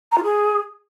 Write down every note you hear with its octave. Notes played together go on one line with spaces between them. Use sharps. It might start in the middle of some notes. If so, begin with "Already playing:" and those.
A#5
F4
G#4